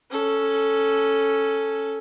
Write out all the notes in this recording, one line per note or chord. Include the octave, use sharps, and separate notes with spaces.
C#4 A4